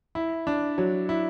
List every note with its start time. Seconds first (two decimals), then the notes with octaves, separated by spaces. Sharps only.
0.15 E4
0.47 D4
0.78 F#3
1.09 E4